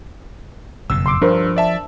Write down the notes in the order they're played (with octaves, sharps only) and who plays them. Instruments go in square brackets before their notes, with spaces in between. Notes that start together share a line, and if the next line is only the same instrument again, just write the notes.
[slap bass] F#1 F2 B2 [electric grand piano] E6
[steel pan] C6 D6
[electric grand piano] G2 [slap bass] F3 [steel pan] D4 A#4 C5
[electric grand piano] D5 E5 A5